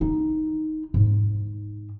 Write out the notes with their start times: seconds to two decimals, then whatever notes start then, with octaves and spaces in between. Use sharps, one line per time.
0.01 D#4
0.94 G#2